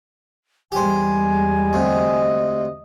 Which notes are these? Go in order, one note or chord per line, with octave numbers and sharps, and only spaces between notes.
E2 G3 G#3 G4 C5 G#5
D2 C3 D#5